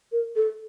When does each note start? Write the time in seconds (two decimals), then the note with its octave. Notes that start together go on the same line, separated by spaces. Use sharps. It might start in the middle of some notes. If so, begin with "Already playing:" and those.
0.12 A#4
0.36 A4